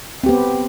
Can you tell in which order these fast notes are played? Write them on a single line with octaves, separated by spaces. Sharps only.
C4 G4 B3